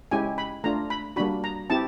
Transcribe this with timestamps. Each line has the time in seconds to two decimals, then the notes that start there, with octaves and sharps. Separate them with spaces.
0.11 G#3 C#4 E4 G4 G#5
0.38 B5
0.64 A3 D4 F4 A#5
0.90 B5
1.16 G3 A#3 D4 F#4 B5
1.44 A#5
1.70 C4 E4 G4 A5